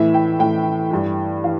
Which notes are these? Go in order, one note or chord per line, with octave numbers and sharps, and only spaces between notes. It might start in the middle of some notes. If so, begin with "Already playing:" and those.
Already playing: A2 E3 E5
G5
A2 E3 G5
G2 E3
E3 F5